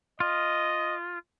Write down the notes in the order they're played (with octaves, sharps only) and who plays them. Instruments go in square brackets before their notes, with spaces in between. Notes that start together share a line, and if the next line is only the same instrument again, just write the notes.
[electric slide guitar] F4 [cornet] D#5